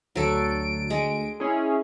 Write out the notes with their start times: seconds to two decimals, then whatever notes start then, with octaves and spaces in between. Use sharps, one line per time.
0.15 D2 F#3 A4 D7
0.90 G#3
1.40 C#4 E4 G#4